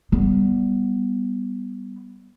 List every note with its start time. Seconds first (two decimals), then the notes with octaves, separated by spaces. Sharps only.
0.12 G3 B3